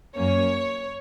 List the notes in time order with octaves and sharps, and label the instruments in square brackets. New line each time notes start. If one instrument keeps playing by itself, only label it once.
[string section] F#2 F#3 A#3 C#4 C#5